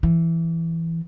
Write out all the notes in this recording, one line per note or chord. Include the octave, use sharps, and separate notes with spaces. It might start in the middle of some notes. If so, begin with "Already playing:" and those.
E3